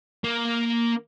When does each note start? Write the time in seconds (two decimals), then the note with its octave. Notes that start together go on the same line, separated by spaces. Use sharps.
0.24 A#3